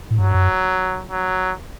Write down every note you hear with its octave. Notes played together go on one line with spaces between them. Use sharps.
A2
G2 F#3
F#2
F#3